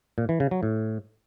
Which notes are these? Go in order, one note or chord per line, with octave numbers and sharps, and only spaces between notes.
A#2
E3
C#3
F#3
A2